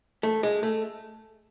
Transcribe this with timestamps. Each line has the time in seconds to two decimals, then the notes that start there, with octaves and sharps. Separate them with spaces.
0.23 A3
0.43 G#3
0.63 A3